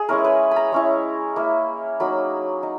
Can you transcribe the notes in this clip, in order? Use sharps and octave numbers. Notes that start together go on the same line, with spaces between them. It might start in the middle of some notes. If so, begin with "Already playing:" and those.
Already playing: G#4
G#3 C#4 E4 A#4
B4
A#5 B5
G#3 C#4 E4
A#3 E4
F#3 A#3 D#4 B5
D#4